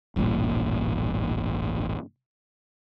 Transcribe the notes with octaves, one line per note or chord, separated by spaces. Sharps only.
D#1 A1 G2 A#2